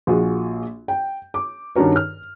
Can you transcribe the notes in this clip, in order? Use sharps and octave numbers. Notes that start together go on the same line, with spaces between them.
A#1 F4 F#4 G#4
G5
D6
G2 D#3 C#4 F#4 A#4 C#5
F6